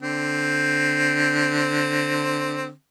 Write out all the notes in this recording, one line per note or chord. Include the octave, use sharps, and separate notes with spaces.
D3 C4